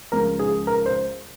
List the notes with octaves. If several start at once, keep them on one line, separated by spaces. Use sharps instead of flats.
C#2 C#3 F3 A#4
G#4
A#4
C5